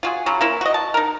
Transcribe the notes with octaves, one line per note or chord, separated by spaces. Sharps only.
F4 F#4 G#4
C#3 F#3 C#4
A#3 E4 F4
F#4 D#5
A5
D#4 A#4